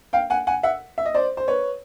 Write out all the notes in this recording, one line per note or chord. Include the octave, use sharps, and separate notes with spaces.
F5 G5
F#5 G#5
F#5 G#5
E5 F#5
E5
D#5
C5 D5
C5
B4 C#5